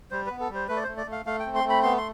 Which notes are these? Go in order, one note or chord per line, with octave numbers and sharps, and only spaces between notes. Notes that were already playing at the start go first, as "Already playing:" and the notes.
G3 C5
B3 B4
A4
G3
C5
A3 B4
D5
A3 C5
D5
A3
F5
A3 F5
G5
C4
C6
A3
B5
B3 C6
C6